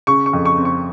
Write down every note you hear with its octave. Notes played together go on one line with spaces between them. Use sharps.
C#3 C#6
C#6
F2
C#6
C4
C#6